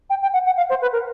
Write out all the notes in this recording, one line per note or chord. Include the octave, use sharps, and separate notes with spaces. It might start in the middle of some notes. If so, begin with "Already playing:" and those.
G5
G5
F#5
F#5
F5
C5
B4
A#4